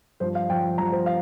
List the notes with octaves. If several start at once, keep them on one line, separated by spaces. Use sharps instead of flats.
G2 F3 C5
F5
G2 F3 G5
G2 F3 A#5
C5
F5